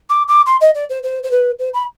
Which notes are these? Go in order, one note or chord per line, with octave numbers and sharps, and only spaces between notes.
D6
D6
C6
D#5
D5
C5
C5
C5
B4
C5
B5